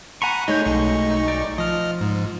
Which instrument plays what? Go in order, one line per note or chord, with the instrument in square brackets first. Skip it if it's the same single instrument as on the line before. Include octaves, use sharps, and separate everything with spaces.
[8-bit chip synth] F#5 B5 [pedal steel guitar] G#5 A#5 C#6
[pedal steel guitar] G#3 A3 G6 [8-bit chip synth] D#4 C#5
[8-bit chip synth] B1 D#4 C#6
[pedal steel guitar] D5
[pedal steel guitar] F3 [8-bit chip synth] D#5 F6
[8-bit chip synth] G#2